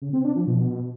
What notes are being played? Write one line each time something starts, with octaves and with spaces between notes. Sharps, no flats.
C#3
C4
D4
F3
B2